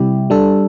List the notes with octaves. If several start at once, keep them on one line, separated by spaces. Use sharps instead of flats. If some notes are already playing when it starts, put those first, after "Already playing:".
Already playing: C3 G3 E4 G4
G3 D4 A4